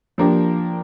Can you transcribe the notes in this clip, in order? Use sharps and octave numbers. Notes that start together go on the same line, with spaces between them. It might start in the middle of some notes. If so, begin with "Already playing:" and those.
F3 A#3 D4 G4